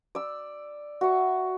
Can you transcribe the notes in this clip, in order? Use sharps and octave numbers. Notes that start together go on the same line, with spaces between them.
D5 E6
F#4 E5 B5 C#6